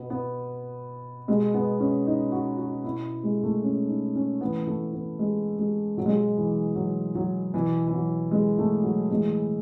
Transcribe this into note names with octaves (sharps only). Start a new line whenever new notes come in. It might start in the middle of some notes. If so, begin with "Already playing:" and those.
Already playing: B2 B3
B3
B2 G#3
B3
C#4
D#4
F#4
F#4
B2 E4
G#3
A3
C#4
D#4
C#4
A2 E3 B3
A3
B3
G#3
G#3
B2 F#3
G#3
F#3
E3
F#3
F#3
B2 E3
E3
F#3
G#3
A3
F#3
A2 E3 G#3